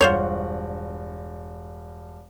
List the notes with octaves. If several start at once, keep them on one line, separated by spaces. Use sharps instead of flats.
E1 G2 F4 C5 C#5 F#5